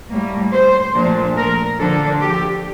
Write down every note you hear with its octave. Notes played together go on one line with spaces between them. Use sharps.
A2 G3 A#3
C5
A#2 F3 A3 D4
A#4
D3 F3 A#3 D4 A4
G4